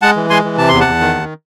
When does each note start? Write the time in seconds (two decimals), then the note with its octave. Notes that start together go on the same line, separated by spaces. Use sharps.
0.02 G#3 F#5 A5
0.16 E3
0.30 G#3 G#5 C6
0.44 E3
0.58 C3 A5
0.69 E2 C6
0.81 F#5 A5
0.86 E2
1.01 D#3
1.15 D#2